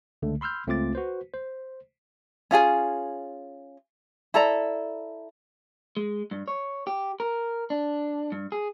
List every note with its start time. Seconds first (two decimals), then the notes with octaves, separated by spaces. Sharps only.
0.22 C#2 D3 A3
0.41 B5 C6 E6 F6 G6
0.67 C#2 A3 C4 F4 D6 A6
0.95 F#4 B4 C5
1.34 C5
2.51 C#4 F4 G#4 G#5
4.34 E4 A4 D5 A#5
5.97 G#3
6.31 G2
6.48 C#5
6.87 G4
7.20 A#4
7.70 D4
8.32 G2
8.52 G#4